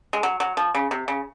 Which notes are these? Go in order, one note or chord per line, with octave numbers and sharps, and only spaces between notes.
G#3
F#3
F#3
F3
C#3
C3
C#3